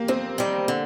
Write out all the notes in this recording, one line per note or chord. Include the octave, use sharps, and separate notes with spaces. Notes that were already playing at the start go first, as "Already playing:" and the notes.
Already playing: A#3 G4
F2 C4
D#3 G3
D3